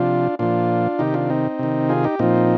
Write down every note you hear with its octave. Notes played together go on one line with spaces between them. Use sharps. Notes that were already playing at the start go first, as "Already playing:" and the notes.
Already playing: C3 F3 D4 F4
A#2 F3 D4 F4
C3 D#3 D#4 G4
D4 F4
C4 D#4
C3 D#3
F4 G#4
D#4 G4
A#2 F3 C4 D#4